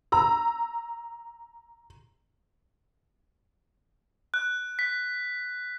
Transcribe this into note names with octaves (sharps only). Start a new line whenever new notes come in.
A#5 E6
F#6
B6